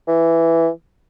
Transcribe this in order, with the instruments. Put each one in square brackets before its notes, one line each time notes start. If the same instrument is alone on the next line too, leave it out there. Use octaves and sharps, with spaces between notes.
[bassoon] E3